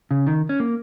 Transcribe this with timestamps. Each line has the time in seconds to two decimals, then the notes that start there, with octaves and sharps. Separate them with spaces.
0.11 C#3
0.27 D#3
0.49 C#4
0.60 A#3